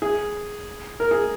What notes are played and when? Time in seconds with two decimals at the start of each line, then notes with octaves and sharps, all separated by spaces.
0.02 G#4
1.00 A#4
1.11 G#4